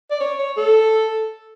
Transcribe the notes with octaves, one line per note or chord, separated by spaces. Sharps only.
D5
C#5
C#5
A4